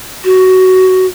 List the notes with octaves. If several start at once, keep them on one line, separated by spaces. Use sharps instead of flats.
F#4